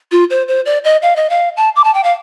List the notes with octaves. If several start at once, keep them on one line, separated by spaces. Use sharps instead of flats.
F4
C5
C5
D5
D#5
F5
D#5
F5
A5
D6
A5
G5
F5